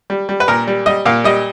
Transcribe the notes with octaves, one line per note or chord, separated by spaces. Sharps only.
G3
G3
B4
A#2 A#4
G3
G3 D#5
A#2 F5
G3 D#5